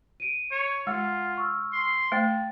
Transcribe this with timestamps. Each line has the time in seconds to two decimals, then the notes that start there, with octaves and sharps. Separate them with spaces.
0.20 D7 D#7
0.51 C#5
0.87 G#3 F4 F#5
1.37 C#6 E6 F6
1.73 C6
2.12 A3 C5 G5 A6